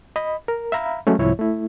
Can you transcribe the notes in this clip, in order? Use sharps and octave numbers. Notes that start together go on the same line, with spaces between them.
D#5 B5
A#4
E5 F5 A#5 B5
F#3 G#3 A3 C#4
C2 G#2 F3 E4 C#5
A3 E4